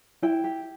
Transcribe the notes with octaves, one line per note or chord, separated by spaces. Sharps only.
E4 G5
G4